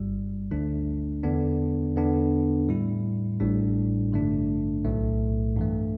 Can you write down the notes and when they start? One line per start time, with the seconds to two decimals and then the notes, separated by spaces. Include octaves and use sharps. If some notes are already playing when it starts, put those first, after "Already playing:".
Already playing: G1 G2 G3
0.51 D2 D3 A3 D4
1.23 E2 D3 B3 D4
1.95 E2 D3 B3 D4
2.69 A2 G3 E4
3.40 A1 A2 G3 D4
4.12 A1 G2 D3 A3 D4
4.85 B1 A2 A3
5.57 G2 E3 A3